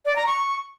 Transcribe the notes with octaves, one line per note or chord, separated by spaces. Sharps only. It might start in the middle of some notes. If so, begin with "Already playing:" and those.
D5
A#5
C#6